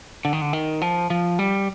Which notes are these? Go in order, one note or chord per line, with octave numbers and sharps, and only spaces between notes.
D3
D#3
D3
D#3
F3
F3
G3